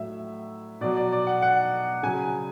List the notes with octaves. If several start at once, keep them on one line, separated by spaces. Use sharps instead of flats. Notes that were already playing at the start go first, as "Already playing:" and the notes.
Already playing: A2 F#3 E5
B2 F#3 D5
D5
D5
F#5
F#5
C#3 F#3 G#5